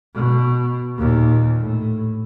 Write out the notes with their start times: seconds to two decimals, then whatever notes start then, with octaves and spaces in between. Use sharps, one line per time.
0.15 B2
0.98 D#2 A#2
1.59 A2